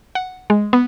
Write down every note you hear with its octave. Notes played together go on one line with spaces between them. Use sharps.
F#5
G#3
B3